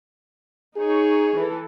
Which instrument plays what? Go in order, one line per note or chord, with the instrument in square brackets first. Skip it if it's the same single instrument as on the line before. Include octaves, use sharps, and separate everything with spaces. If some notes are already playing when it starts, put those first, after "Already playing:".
[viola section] D#4 C#5 [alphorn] G#4
[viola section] E3 A4